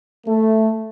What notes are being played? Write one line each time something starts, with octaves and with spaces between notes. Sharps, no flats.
A3